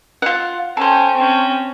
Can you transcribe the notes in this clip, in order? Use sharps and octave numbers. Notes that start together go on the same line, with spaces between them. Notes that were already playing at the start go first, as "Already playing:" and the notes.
F4 F#5
C#4 A4 C5 G5
C4 C#4